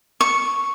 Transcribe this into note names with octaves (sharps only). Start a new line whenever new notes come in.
C#6